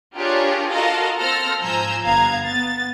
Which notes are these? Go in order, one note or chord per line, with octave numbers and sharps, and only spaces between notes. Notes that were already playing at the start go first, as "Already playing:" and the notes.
D4 F4 G4 G#4 A#4 C#5
F4 F#4 A4 A#4 D#5 F5
C4 A4 F6 A#6
G#2 F3 G#5 A#5 E6 G6
G1 B3 F5 A#5 G#6
B3 A6